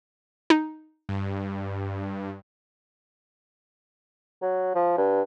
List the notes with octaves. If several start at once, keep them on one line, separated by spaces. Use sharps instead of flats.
D#4
G2
F#3
F3
G2